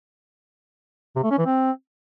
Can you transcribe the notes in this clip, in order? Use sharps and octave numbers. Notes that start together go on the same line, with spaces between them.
C3
A3
C#4
E3
C4